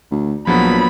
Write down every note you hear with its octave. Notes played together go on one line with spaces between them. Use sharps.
D2
A#1 F3 F#3 B3 B5